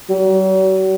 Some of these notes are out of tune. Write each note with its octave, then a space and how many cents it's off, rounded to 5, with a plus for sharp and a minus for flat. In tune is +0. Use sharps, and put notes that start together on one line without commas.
F#3 +45